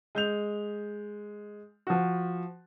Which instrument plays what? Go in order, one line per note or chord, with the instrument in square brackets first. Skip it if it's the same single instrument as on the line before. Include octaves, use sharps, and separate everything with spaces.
[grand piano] G#3 G6 F7
F3 F#4